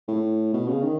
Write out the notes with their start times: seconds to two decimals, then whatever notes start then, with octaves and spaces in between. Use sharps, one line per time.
0.08 A2
0.54 B2
0.68 C#3
0.83 D#3